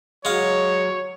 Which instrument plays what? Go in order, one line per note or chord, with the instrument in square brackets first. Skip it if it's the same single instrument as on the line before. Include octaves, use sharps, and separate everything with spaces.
[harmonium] F#3 [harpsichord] G#3 F5 [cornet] C#5